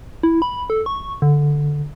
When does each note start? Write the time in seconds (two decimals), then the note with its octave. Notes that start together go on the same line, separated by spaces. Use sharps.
0.23 E4
0.42 B5
0.70 A4
0.86 C#6
1.22 D3